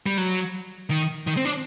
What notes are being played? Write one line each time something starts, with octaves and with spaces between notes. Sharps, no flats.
G3
F#3
D#3
D#3
C4
D4